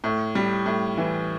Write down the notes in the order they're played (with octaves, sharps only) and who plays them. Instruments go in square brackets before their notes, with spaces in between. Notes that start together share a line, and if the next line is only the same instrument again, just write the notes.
[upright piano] A2
G3
A2
E3